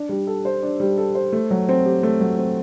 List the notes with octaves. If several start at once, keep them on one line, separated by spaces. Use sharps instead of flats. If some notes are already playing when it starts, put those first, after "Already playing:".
Already playing: D4
G3
A4
C5
D4
G3
A4
C5
A3
F#3
C4
G4
A3
F#3
C4